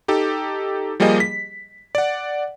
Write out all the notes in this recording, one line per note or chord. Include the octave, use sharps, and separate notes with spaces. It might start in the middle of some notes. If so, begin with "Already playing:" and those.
D#4 G4 A4
F3 G3 A#3 G4 G#4 D#5
B6
D5 F#5